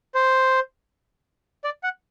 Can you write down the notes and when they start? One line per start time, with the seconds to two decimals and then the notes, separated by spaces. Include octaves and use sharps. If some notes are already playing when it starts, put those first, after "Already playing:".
0.15 C5
1.64 D5
1.83 F#5